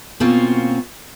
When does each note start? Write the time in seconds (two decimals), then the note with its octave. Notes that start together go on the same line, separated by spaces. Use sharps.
0.20 B2 A#3 C4 C#4 F4 F#4